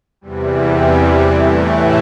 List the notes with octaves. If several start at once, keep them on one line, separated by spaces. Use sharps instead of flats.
E2 C3 E3 G3
A2 E3 A3